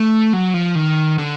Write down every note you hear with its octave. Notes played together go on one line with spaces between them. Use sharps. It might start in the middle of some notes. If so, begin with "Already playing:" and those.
Already playing: A3
F#3
F3
D#3
D3